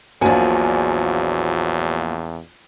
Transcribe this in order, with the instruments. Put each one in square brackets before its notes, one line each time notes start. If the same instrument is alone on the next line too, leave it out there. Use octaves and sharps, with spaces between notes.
[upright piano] A#1 A#2 G#5 [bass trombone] E2 [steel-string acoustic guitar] F3 F#3